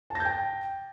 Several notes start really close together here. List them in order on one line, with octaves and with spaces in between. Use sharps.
A5 A#6 G6 G5